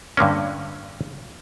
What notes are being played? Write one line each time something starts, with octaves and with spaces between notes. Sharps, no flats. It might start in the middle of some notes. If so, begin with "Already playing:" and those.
G2 D3 A#3 C#4